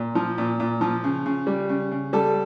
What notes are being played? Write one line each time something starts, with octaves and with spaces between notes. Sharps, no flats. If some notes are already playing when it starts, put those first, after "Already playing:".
Already playing: A#2
F3
A#2
A#2
F3
C#3
C#3
G3
C#3
C#3
G3 A4